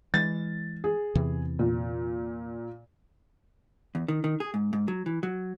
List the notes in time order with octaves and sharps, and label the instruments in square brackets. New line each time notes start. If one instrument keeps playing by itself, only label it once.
[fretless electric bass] E3 G#3 [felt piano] A6
[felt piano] G#4
[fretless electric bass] E2 C3 E3
[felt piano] A#2
[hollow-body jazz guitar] E2
D#3
D#3
G#4
G#2
G#2
F#3
E3
F#3